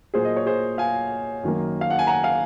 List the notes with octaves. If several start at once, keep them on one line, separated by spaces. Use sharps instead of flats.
A#2 F#3 A#3 G#4 C5
D#5
C#5
G#4 C5
F5 G#5
F#2 D#3 A#3
F5
F#5
G#5
F#5 A#5
F5 G#5